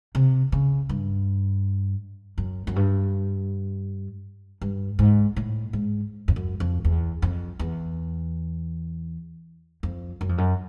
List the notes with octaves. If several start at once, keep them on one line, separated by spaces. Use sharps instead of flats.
C3
C#3
G2
F#2
F#2
G2
G2
G#2
A2
G#2
F2
F#2
F2
E2
F2
E2
F2
F#2
F2
F#2